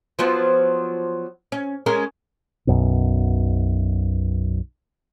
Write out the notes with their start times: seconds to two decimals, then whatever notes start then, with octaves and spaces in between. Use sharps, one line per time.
0.19 F3 F#3 B3
1.52 C#4
1.86 G#3 C#4 A#4
2.67 B1 F#2 B2